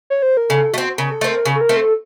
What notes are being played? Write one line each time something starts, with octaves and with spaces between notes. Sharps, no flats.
C#5
C5
A#4
C#3 A4
A3 C4 F#4
C#3 A#4
A4
A3 C4 A#4
C#3
A4
A#4
A3 C4
A4